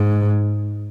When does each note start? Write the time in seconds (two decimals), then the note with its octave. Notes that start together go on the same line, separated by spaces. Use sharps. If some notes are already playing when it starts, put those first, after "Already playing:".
Already playing: G#2